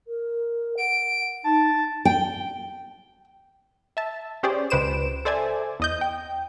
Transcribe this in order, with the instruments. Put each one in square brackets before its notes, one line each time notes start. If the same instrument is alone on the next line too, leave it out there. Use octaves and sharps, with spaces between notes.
[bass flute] A#4
[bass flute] F#5 [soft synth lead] D7
[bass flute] D#4 [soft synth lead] A5
[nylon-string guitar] G5
[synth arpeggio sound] E5 A5
C#4 G4 G#4 C5 D5
C#2 B4 C5 D7 E7
A4 C5 D5 E5 G#5
E2 D#5 G6
G5